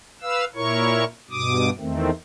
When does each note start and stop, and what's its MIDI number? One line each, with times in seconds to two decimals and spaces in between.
0.22 0.45 71
0.22 0.45 77
0.22 0.45 88
0.55 1.04 46
0.55 1.04 64
0.55 1.04 70
0.55 1.04 73
0.55 1.04 85
1.30 1.70 43
1.30 1.70 47
1.30 1.70 86
1.30 1.70 87
1.79 2.10 40
1.79 2.10 51
1.79 2.10 57
1.79 2.10 60